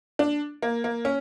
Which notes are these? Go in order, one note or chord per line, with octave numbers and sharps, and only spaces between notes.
D4
A#3
A#3
C#4